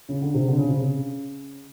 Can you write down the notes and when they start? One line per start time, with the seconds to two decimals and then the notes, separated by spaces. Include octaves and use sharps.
0.09 C#3
0.22 D3
0.34 C3
0.47 D3
0.58 C#3
0.68 C3
0.79 C#3